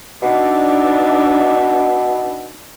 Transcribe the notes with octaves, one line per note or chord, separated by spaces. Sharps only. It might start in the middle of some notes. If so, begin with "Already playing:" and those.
B2 D4 D#4 E5